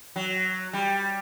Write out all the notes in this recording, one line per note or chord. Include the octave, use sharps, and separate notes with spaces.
F#3
G3